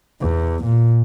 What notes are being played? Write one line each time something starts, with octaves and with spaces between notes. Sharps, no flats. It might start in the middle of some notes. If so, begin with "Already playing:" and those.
E2
A#2